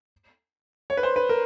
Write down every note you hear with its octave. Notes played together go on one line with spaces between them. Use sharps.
C#5
B4
C5
B4
A#4